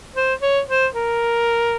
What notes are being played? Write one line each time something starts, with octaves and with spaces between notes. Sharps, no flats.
C5
C#5
C5
A#4